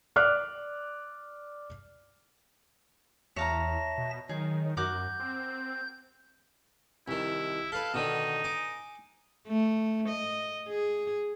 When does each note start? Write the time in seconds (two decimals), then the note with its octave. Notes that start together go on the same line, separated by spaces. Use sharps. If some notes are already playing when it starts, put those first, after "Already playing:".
0.16 D5 D6 F6 F#6
3.36 E2 C#5 E5 F5 A5 A#5 A#6
3.98 B2
4.29 D#3 F#3 G#4
4.77 F#2 F#4 A#4 D6 G6
5.20 C4
7.08 C2 D#3 E4
7.72 A4 B4 F5
7.94 B2 D3 D#3 D#4
8.44 G#5 D6
9.48 A3
10.09 D#5
10.68 G#4